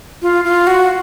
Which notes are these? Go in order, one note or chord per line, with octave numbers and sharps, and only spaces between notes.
F4
F4
F#4